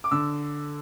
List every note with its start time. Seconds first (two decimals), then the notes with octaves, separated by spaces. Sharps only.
0.04 D6
0.11 D3 E6